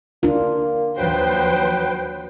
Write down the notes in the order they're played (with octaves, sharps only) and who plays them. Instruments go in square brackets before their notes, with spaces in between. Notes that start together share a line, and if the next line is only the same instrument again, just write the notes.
[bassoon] A#3 [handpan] D4 F4
[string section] D#2 F3 C5 [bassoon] F#3 [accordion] B4 G5